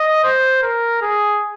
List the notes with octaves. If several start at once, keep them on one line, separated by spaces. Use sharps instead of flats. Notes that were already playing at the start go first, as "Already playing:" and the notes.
Already playing: D#5
C5
A#4
G#4